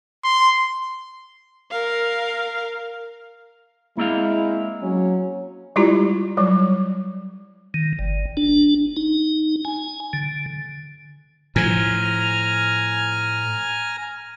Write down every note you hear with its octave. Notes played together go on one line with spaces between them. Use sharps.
C6
A#4 F5
G#3 A#3 C4 E4 F5
F#3 C#4
G3 G#3 E4 F4 G4 A#5
F#3 G3
D#3
G1
D4
D#4
G#5
D3
A2 F3 G#5 A#5 F6